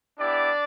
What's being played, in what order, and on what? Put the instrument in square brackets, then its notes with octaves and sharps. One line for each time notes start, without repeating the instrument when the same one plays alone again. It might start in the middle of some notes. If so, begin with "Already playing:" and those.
[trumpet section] B3 D4 E4 G4 D5